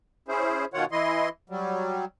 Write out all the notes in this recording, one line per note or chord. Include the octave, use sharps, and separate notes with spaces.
C#4 E4 G#4 C5
B2 D#3 F4 C#5 F#5
E3 E4 D#5 C6
F#3 G3